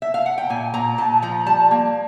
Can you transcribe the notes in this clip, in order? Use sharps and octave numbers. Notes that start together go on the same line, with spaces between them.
E5
F5
F#5
G5
A#2 G#5
A#2 A#5
A#2 A5
F3 A#5
G3 A5
A#3